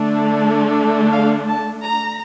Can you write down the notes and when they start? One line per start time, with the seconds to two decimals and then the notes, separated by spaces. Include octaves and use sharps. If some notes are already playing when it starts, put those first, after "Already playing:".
Already playing: D3 A3 D4
1.11 F5
1.48 A5
1.83 A#5